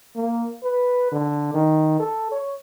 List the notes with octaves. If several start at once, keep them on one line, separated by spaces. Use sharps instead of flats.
A#3
B4
D3
D#3
A4
C#5